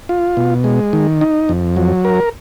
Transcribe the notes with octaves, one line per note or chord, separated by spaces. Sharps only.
F4
B2
G#3
D#3
D#4
F2
F#3
A#4